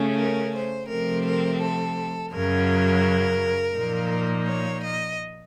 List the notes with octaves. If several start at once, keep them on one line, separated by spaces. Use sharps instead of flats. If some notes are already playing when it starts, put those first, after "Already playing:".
Already playing: C#3 A3 C#4
A#4
C5
C3 F3 A3 C4 A#4
A#4
A4
F#2 C#3 F#3 A#4
A#2 F3 A#3 D#4
C#5
D#5